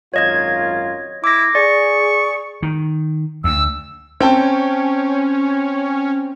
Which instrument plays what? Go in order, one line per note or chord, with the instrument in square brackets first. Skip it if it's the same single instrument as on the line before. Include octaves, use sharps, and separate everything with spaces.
[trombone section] G#1 F#2 F4 [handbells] C#5 D#5 G#6
[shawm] E4 [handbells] D6 A#6
[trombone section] G#4 [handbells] D5 [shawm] C#6
[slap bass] D#3
[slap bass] D2 [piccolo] E6
[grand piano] C4 G5 A5 [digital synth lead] C#4